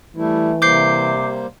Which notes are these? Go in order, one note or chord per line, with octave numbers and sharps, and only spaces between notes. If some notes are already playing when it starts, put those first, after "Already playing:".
E3 G3 A3 E4
C3 G3 A#3 C5 D6 G6 C7